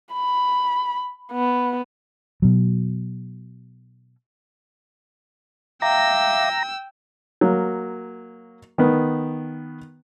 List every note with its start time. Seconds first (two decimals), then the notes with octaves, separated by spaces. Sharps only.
0.13 B5
1.32 B3
2.42 B2 F#3
5.82 E5 F5 G5 A#5 D6 E6
7.41 F#3 A#3
8.78 D#3 B3